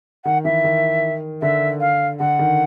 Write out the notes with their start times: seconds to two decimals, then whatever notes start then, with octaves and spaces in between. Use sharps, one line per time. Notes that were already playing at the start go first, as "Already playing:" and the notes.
0.25 D#3 F#5
0.44 E3 E5
0.64 D#3
1.42 D3 E5
1.80 F5
2.20 D3 F#5
2.39 D#3